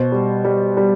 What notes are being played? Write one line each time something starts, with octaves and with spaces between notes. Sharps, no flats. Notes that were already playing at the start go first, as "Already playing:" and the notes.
Already playing: B2 C5
G3
G3
G3